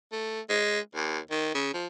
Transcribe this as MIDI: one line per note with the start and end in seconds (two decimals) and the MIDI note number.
0.12 0.41 57
0.49 0.80 56
0.95 1.19 39
1.31 1.51 51
1.54 1.71 49
1.74 1.87 53